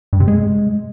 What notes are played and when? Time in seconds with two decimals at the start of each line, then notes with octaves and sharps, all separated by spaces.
0.13 G2
0.20 C3
0.28 G#3